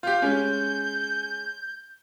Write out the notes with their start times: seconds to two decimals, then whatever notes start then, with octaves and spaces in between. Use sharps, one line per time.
0.03 F4 G4 G6
0.22 G#3 C#4